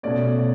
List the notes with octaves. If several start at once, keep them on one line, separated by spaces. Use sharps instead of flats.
B2 A3 C#4 D5
D5